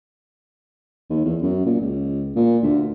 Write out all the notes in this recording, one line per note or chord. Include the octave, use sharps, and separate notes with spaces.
D#2
E2
F#2
A#2
C#2
A#2
D2